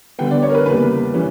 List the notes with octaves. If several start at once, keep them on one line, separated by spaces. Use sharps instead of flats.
D3 G3 B3 G5
D5
C#5
A#4
B4
E2 C#3 G3 A#3 B4
C#3 E3 G3 C#4